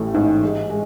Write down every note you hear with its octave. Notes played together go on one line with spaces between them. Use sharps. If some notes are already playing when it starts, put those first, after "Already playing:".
Already playing: A1 A2 A3
G#2
G#3
G#3